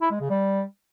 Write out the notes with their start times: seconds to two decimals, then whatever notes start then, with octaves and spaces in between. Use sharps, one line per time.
0.01 E4
0.11 G#3
0.20 C#3
0.30 G3